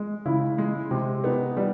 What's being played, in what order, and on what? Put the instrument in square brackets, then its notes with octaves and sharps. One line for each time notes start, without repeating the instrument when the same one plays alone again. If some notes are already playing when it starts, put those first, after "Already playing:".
Already playing: [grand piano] G#3
C#3 E4
G#3
C3
B3 D#4
G3